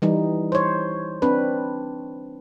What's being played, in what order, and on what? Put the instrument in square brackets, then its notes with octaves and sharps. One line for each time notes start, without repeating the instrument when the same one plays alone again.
[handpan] E3 G3 D#4
C5 C#5
C4 D4 B4